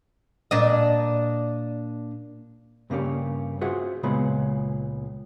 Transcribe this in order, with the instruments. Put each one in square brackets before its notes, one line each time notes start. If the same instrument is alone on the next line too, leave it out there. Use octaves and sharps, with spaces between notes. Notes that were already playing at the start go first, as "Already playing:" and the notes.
[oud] A#2 D4 D#5
[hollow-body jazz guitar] G2 C#3 A#3 G4 C#5
F4 F#4 G#4 C5 E5 F#5
C#2 A#2 C#3 G#3 B3 B5